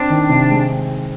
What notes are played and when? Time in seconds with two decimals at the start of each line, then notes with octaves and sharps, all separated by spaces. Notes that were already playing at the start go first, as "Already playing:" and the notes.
Already playing: C4 D4
0.10 D#3
0.29 C3
0.50 G#3